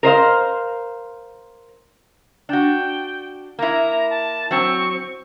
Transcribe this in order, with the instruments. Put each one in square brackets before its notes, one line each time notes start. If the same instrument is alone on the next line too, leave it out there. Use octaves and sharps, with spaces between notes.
[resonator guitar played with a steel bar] A#4 C5 D#5 F5
[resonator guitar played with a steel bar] D4 F#4 [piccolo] G5
[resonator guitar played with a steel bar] A#3 E4 [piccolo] A#5
[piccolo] A5
[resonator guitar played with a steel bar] F#3 C4 [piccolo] C#6